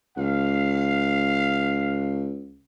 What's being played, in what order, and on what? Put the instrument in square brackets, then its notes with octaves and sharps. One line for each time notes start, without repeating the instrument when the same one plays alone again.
[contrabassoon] C#2 [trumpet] F5